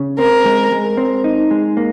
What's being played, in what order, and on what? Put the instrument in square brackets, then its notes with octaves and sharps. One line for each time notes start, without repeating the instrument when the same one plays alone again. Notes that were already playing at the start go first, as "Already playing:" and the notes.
Already playing: [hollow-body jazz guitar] C#3
[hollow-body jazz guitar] C4 [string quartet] A#4
[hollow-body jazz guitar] G#3
G#3
C4
D#4
G#3
A#3